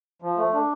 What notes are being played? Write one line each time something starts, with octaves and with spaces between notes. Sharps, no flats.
F3
A3
D4